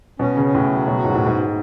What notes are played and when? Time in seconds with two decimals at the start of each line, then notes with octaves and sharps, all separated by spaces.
0.19 B2 C#4
0.37 C#3
0.45 C#4
0.55 A2
0.71 F#3
0.88 B2
0.96 F#4
1.05 G#2
1.15 A2
1.22 G#2 B2